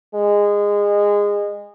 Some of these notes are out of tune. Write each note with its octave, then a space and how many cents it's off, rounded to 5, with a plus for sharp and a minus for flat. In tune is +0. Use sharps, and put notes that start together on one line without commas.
G#3 -20